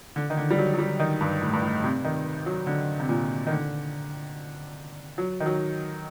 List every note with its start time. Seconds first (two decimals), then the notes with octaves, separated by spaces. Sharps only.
0.16 D3
0.30 D#3
0.37 D3
0.50 G3
0.58 F#3
0.74 F#3
0.78 G3
1.00 D#3
1.21 G2
1.42 A2
1.53 G2
1.62 A2
1.84 C3
2.04 D#3
2.46 F#3
2.67 D3
3.00 C3
3.09 A#2
3.47 D#3
3.51 D3
5.18 F#3
5.40 D#3
5.46 F#3